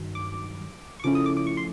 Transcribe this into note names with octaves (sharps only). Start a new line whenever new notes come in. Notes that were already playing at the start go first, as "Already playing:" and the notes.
Already playing: G2 D#3 F#3
D6
C#6
C#3 F3 A3 C#4 E4 D6
D#6
D6
D6
C#6
C6